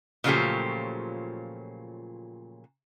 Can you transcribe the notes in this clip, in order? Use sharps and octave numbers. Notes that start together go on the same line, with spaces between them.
A#2 C#3 F3 F#3 A3 G4